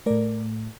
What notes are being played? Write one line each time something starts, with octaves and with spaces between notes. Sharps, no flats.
A2 A3 A#4 D5